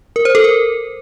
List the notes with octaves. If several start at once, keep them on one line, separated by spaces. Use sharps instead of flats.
A#4
C5
A4
A#4